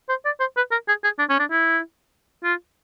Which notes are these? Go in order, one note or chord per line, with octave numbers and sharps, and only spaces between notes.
C5
D5
C5
B4
A#4
G#4
G#4
D4
C#4
D4
E4
F4